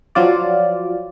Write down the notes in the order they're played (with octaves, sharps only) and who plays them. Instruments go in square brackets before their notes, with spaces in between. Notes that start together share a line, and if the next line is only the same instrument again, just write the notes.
[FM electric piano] F3 F#3 F4 D5